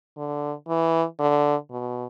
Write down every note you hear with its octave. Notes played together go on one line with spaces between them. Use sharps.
D3
E3
D3
B2